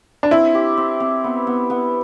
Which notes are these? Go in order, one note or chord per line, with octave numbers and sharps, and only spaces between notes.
D4
C4 E4
G4
C4
C4
B3
B3
B3